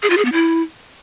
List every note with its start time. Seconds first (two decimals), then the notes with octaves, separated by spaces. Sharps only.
0.03 G#4
0.10 F4
0.17 G#4
0.25 B3
0.32 E4